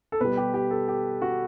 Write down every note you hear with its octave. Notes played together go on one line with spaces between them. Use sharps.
A4
B2 G3 B4
G4
G4
A4
G4
F#4